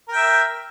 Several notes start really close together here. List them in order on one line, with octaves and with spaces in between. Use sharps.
A#4 G5 E5